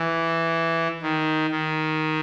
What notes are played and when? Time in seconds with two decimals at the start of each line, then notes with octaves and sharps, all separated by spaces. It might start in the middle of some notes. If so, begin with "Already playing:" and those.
Already playing: E3
1.02 D#3
1.51 D#3